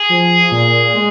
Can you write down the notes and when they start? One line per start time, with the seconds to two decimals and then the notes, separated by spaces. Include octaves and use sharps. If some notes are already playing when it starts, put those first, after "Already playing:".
Already playing: G#4
0.09 F3
0.51 A#2
0.94 G#3